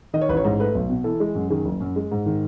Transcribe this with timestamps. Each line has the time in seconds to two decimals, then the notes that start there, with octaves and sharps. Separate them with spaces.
0.14 D#3 D#5
0.21 C#5
0.29 A1 B4
0.37 C#5
0.44 G#2
0.59 A3 B4
0.75 B1
0.90 B2
1.04 E3 A4
1.20 G#3
1.35 F#2
1.50 D#3 G#4
1.65 F#1
1.80 F#2
1.96 G#3
2.12 G#2
2.26 D#3